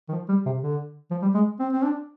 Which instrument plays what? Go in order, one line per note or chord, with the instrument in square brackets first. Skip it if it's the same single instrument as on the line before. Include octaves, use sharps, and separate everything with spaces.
[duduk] D#3
F3
G3
C3
D3
F3
G3
G#3
C4
C4
D4